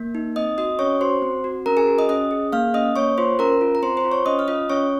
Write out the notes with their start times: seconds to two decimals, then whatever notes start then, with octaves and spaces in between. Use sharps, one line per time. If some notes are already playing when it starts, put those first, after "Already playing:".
Already playing: A#3
0.15 D#4
0.36 C4 D#5 D#6
0.58 F#4 D#5 D#6
0.79 C#4 C#5 C#6
1.01 F#4 C5 C6
1.22 C4
1.44 F#4
1.66 C#4 A#4 A#5
1.77 G#4 G#5
1.87 F#4
1.98 D#5 D#6
2.09 C#4 D#5 D#6
2.31 G#4
2.52 A#3 F5 F6
2.74 C#4 D#5 D#6
2.96 A#3 C#5 C#6
3.18 F4 C5 C6
3.39 C#4 A#4 A#5
3.61 F4
3.75 A#5
3.83 C4 C5 C6
3.97 C5 C6
4.04 F4
4.11 C#5 C#6
4.26 C#4 D#5 D#6
4.39 F6
4.48 F4 D#5 D#6
4.70 C#4 C#5 C#6